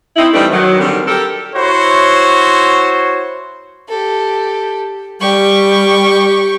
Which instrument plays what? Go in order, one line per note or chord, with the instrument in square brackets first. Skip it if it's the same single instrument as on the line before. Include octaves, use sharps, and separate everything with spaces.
[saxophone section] C4 D#4 E4
E3 G3 A3 C4 D4 D#4
D#3 F#3
D3 D#3 G3 C4
G4 A4 A#4
[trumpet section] E4 F#4 C5 C#5
[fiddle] G4 A4
[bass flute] G3 [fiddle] G4 C#6